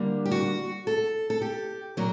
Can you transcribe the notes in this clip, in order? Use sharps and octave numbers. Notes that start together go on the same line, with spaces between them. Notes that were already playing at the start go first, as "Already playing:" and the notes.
Already playing: D3 G3 A#3
G4
F#4
A4
A4
G4
A#2 F#3 A#3 A#4